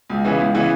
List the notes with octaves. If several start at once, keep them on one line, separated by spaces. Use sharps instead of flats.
C#2
C#3 E3 B3 E4
C#2
C#3 E3 B3 E4